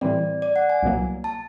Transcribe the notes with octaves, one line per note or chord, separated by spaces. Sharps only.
A2 E3 G3 C4 D5
D5
F#5
G#5
C2 B2 F#3 A#3
A5